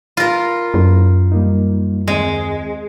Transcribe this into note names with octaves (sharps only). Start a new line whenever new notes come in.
F4 A#4 B5
F#2
G3 A#3 D#4
D#2 G#3 C4